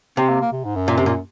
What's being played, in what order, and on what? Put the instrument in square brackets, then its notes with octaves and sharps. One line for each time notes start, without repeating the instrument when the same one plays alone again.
[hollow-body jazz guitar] C3 [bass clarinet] C4
[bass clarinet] A#3
A#3
C3
G#2
F#2
[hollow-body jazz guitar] A#2
C3
A#2